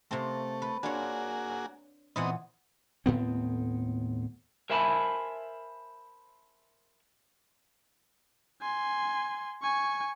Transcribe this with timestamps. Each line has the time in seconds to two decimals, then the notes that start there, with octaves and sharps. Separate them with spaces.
0.11 C3 A3 A#3 C4
0.62 B4
0.83 A#3 D4 F4 F#4 G#4 C#5
2.16 A#2 E3 B3 C4 D#5 F#5
3.06 D#2 A2 B3 C4
4.70 A#4 C5 E5 G#5 A5 B5
8.62 G#5 C6
9.62 G#5 C#6